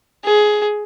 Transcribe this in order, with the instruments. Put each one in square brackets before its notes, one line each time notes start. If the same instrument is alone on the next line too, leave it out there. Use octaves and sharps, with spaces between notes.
[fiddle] G#4